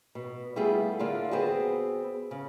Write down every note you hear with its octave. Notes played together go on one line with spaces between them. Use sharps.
B2
G3 A3 B3 E4 F4 G#4
D3 A#3 D4 E4 F4
B3 C4 F#4 G#4
C#3